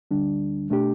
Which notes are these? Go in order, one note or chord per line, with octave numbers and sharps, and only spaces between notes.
D2 D3 G3 D4
B2 A3 D4 G4